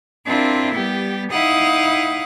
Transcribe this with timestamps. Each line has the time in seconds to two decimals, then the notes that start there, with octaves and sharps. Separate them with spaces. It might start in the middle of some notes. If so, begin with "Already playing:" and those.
0.24 C4 D4 E4 F4 A#4
0.73 G3 B3 G4
1.31 D#4 E4 F5 F#5 D#6